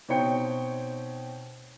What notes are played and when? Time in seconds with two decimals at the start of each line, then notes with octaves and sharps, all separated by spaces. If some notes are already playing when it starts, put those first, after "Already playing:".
0.09 B2 C4 D#4 C#5 G5 C#7